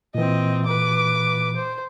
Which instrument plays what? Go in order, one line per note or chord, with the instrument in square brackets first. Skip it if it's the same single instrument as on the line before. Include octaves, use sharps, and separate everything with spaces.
[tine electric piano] A#2 E3 [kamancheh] C4 D#5
[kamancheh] B4 D6
C5